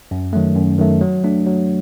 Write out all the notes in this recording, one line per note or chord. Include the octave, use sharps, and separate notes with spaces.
F#2
D#3 F#3 A3
F#2
D#3 F#3 A3
F#3
A3 D4
F#3